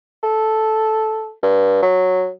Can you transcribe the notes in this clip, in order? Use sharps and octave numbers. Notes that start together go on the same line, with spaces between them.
A4
G2
F#3